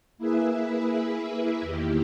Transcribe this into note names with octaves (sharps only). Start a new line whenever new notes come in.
A#3 E4 G#4 B4 E5
E2 D#3 A#3 E4 G4